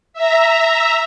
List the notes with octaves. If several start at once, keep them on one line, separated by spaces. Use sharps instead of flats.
E5 A#5